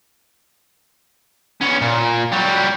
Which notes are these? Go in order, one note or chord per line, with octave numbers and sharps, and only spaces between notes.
B3 C#4
A#2
F#3 G3